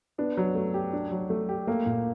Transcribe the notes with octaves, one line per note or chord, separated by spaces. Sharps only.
B3 D4
F#3
A3
G4
D4
F#3
A3
G4
A3 A#3
A#2